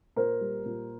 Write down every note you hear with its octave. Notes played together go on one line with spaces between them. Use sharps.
A#2 A#4 C5
G3
A#2